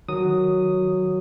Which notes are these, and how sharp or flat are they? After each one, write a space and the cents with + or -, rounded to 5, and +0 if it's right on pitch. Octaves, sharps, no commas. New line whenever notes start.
D#3 +0 F#3 +0 D#6 +0